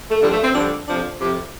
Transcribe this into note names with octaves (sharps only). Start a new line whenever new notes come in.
A3
G2 D3 F3 G3
A3
C4
G2 D3 F3 D4
F2 C3 F3 D4
F2 C3 F3 G4